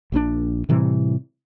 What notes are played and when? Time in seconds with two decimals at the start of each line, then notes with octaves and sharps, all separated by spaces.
0.12 A#1 A#2 D#3 D4
0.69 A2 C3 E3 G3